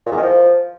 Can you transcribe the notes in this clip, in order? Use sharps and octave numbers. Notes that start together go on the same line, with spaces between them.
A#2
E2
D#3
F3